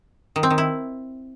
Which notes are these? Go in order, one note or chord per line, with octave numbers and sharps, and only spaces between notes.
D#3
C4
D#3
E4